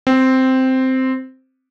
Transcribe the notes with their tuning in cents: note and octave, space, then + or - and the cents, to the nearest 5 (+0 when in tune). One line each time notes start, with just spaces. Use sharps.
C4 -5